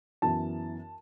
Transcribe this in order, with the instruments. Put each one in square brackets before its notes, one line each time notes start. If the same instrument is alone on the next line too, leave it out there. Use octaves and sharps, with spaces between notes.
[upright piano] F#2 E3 B3 A5